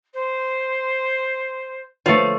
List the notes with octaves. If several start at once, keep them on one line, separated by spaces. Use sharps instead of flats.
C5
A3 F4 B4 C#5